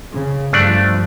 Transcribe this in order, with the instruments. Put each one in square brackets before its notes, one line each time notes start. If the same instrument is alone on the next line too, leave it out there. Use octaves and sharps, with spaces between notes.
[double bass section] C#3
[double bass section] G2 F3 [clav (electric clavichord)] A3 D4 D5